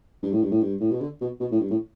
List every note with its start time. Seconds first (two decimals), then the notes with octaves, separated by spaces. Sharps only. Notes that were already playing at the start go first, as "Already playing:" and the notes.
0.23 G2
0.32 A2
0.42 G2
0.51 A2
0.61 G2
0.80 A2
0.91 B2
1.01 D3
1.21 B2
1.40 B2
1.51 A2
1.60 G2
1.70 A2